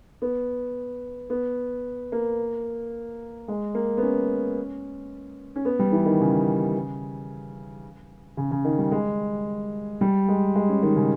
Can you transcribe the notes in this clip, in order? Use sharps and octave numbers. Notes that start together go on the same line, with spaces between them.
B3
B3
A#3
G#3
A#3
B3
C#4
C#4
B3
G3
E3
D#3
C#3
C#3
C#3
D#3
G3
G#3
G3
G#3
G#3
C#4
D#3
C#3